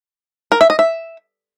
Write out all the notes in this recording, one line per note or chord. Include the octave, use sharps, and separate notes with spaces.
A#4
E5
D#5
E5